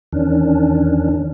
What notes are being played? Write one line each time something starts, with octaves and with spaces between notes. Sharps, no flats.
E2 D#3 C#4 D4